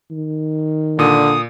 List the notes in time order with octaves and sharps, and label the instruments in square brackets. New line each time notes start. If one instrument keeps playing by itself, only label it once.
[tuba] D#3
[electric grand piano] A#2 [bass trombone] D3 [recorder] D#6